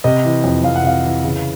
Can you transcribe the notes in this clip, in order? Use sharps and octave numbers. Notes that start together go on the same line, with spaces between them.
C3 D#5
E3
F2
F2 F5
F#5
C3 F5
E3
C#3